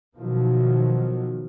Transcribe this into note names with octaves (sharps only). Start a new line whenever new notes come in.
B2 D#3 F3 F#3